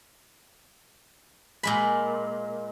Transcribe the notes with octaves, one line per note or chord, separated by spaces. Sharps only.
A#2 G#3 B5